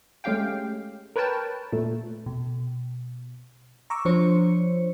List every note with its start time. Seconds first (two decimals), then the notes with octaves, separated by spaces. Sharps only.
0.24 G#3 A3 C#4 G4 F5 G5
1.16 A#4 B4 C#5 G5 A5
1.72 A#2 A3
2.26 B2
3.90 A#5 C#6 D6 E6
4.05 F3 D4 C5 C#5 C#7